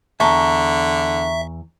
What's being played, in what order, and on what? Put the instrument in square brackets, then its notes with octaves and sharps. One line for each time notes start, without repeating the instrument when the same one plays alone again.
[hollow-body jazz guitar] E2 A5 [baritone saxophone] D3 [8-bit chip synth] E5 [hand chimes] A#5 C#6